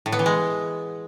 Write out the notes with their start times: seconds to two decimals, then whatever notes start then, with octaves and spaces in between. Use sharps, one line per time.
0.06 A2
0.12 B3
0.19 E3
0.26 G#3